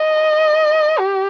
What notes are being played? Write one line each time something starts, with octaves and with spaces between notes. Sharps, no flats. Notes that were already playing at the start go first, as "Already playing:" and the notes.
Already playing: D#5
G4